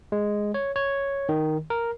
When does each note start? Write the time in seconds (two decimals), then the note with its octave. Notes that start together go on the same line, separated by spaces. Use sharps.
0.12 G#3
0.54 C#5
0.76 C#5
1.29 D#3
1.70 A#4